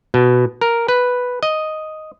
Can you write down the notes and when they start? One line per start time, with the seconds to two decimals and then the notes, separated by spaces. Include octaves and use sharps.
0.14 B2
0.61 A#4
0.88 B4
1.43 D#5